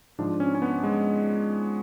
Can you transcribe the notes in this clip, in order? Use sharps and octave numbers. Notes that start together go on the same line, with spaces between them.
G#2 F3 D4
C#4
C#4
B3
G#3